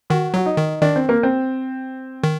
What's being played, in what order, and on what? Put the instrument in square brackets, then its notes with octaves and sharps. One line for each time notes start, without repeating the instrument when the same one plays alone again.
[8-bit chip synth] D#3 [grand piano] F#4
[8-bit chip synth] F#3 [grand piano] F#4
[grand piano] D#4
[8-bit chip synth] D#3
[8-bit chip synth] D#3 [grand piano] D4
[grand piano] C4
A#3
C4
[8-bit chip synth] D#3